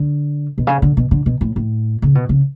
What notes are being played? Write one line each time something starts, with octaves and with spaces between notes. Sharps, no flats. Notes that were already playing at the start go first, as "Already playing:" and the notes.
Already playing: D3
B2
C#3
D3
B2
D3
B2
A2
A2
C#3
B2
C#3